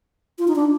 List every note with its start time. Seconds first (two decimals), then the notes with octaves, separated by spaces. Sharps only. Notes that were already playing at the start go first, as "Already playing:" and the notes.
0.39 F4
0.48 D#4
0.56 D4